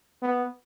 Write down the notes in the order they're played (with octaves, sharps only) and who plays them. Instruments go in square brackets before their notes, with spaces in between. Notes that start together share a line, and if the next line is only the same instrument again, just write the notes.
[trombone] B3